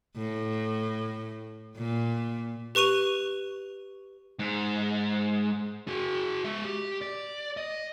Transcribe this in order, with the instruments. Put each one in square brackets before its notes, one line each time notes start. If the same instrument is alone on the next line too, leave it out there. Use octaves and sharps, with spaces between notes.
[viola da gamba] A2
A#2
[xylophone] G4 B4 C#6 D#7 F7
[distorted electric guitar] G#2
[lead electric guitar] F#4 G#4
G#3 E5
G4
D5
D#5